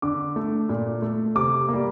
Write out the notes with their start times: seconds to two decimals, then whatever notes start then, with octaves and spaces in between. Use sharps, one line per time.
0.02 D3 D6
0.36 A3
0.69 A#2
1.02 A3
1.35 C3 D6
1.68 G3 A#3